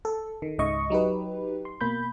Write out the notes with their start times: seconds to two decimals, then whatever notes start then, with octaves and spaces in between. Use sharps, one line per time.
0.05 A4
0.42 D#3
0.58 C#2 G#2 C#3 D#5 E5 C#6
0.90 F#3 D#4 G4 B4
1.65 C6
1.81 B2 A#3 B5 G6